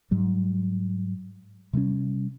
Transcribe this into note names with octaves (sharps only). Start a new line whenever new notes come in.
G#2 F#3 G3
C3 G3 G#3 C#4